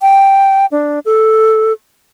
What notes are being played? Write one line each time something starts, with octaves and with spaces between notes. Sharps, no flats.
G5
D4
A4